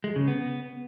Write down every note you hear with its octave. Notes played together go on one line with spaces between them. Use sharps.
G#3
C#3
B3